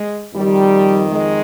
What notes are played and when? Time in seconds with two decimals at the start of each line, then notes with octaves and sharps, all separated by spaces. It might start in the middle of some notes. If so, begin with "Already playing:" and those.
Already playing: G#3
0.34 F2 D#3 G3
1.11 G#3